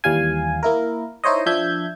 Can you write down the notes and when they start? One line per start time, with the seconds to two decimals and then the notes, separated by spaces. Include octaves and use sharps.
0.04 D#2 E3 G3 F5 G#5
0.63 A#3 E4 A#4
1.24 D#4 E4 C5 C#5 D#5
1.46 F3 D4 E5 G6 G#6